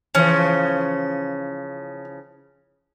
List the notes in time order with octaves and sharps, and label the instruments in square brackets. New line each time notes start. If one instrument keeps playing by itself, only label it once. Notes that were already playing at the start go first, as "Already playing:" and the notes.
[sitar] C#3 E3 F3 [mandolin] C#4